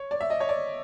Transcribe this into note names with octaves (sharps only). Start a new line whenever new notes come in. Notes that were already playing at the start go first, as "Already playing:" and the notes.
Already playing: C#5
D5
E5
D#5
C#5
D5